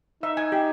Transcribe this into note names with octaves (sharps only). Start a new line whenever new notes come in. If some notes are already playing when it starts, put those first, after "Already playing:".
D#4 E5
G#5
G4